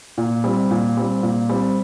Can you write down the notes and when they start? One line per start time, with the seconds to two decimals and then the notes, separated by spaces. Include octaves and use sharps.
0.18 A#2
0.44 G3 C4
0.71 A#2
0.97 G3 C4
1.23 A#2
1.49 G3 C4